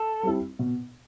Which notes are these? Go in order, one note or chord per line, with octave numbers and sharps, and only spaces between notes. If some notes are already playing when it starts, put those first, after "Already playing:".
Already playing: A4
G3 C4 E4
B2